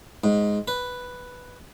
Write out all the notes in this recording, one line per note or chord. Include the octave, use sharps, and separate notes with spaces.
G#2
B4